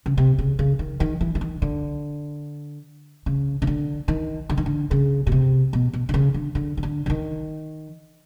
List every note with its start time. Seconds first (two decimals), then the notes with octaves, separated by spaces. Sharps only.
0.06 C#3
0.18 C3
0.38 C#3
0.59 C#3
0.79 D#3
1.00 D#3
1.21 E3
1.35 E3
1.41 D#3
1.62 D3
3.26 C#3
3.62 C#3
3.67 D3
4.08 D#3
4.49 D3
4.57 D#3
4.66 D3
4.91 C#3
5.27 B2
5.32 C3
5.73 B2
5.93 B2
6.09 D3
6.14 C#3
6.34 D3
6.55 D3
6.77 D#3
6.83 D3
7.06 D3
7.10 D#3